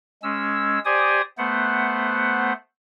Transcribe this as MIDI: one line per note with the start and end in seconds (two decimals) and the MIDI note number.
0.23 0.79 56
0.23 0.79 61
0.23 0.79 88
0.85 1.21 67
0.85 1.21 72
0.85 1.21 74
0.85 1.21 80
0.85 1.21 87
1.38 2.53 57
1.38 2.53 59
1.38 2.53 72
1.38 2.53 78